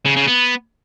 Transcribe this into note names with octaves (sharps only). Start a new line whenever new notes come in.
C#3
C#3
B3